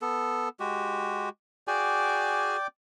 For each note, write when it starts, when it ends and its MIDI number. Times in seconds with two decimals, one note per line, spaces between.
0.02 0.49 59
0.02 0.49 69
0.60 1.29 56
0.60 1.29 66
0.60 1.29 67
1.68 2.57 66
1.68 2.57 68
1.68 2.67 74
1.68 2.67 79
1.68 2.57 80
1.68 2.67 86